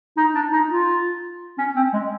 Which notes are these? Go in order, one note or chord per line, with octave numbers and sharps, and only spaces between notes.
D#4
D4
D#4
F4
C#4
C4
G#3